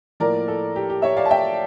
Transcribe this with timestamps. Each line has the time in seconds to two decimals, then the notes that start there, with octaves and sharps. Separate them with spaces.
0.20 A2 F3 A#3 E4 A#4 D5
0.48 A4
0.76 G4
0.90 G4
1.02 C#5 E5
1.17 D5 F5
1.25 A5
1.31 E5 G5